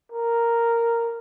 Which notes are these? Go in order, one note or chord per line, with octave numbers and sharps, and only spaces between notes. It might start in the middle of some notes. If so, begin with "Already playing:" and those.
A#4